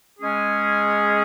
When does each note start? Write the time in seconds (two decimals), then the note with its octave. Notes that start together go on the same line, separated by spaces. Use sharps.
0.19 G#3 C#4 G#4